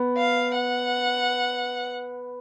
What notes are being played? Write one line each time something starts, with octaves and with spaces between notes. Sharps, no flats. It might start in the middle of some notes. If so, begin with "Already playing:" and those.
Already playing: B3
F5
F#5